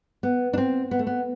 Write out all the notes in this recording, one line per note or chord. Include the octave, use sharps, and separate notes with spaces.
B3
D4
C4
B3
A3
B3